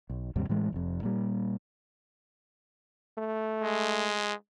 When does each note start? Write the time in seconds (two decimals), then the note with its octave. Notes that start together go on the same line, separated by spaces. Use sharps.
0.10 B1
0.36 D#2 G#2 C3 G3
0.49 A2 E3 G#3 A3
0.72 F1 F2
1.01 G2 A#2 G3
3.18 A3
3.62 G#3